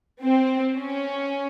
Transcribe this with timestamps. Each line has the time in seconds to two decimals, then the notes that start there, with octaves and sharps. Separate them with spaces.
0.22 C4
0.77 C#4